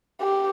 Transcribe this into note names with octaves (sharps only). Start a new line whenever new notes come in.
G4